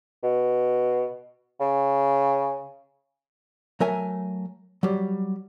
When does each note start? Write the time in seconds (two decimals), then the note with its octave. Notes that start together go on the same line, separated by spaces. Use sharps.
0.23 B2
1.60 C#3
3.80 F#3 A3 A#4 E5 G#5
4.83 F#3 G3